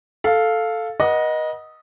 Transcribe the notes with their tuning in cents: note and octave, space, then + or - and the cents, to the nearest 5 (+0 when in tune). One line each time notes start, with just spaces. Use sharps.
A4 +0 F5 +0
B4 -45 D#5 +0 F#5 +0